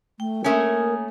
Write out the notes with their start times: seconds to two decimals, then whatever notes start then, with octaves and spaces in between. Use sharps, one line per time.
0.20 A3 G5
0.44 A3 A#3 C#4 A#4 G#5 D#6